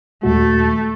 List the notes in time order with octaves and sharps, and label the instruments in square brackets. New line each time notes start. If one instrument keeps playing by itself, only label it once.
[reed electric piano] D#2 A#2 F#4 [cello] A3